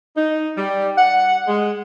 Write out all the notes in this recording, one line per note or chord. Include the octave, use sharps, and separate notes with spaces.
D#4
G3
F#5
G#3